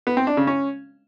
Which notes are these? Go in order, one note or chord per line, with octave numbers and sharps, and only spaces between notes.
B3
C4
D4
C#3
C#4